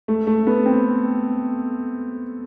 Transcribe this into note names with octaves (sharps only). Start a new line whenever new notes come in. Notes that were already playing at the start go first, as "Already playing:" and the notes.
A3
A3
B3
C4